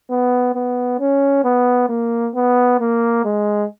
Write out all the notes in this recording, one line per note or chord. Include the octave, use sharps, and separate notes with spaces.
B3
B3
C#4
B3
A#3
B3
A#3
G#3